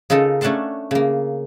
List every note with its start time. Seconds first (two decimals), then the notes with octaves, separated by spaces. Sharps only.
0.10 C#3 D#4 F4 A4 A#4
0.41 A3 C#4 D4 F#5 A5 C6
0.91 C#3 A#3